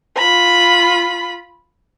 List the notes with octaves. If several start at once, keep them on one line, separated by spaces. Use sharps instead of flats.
F4 B5